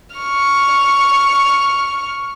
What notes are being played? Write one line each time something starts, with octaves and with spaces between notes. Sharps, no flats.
C#6 F6